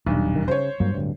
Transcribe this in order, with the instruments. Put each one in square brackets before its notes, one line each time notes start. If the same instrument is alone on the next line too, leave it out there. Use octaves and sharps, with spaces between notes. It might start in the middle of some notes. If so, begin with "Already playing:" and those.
[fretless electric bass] D#1 [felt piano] B1 G2
[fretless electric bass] E1 D#3
[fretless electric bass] C#3 [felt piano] C5 C#5
[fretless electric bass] G2 F#3 A#3
D1 D2 G2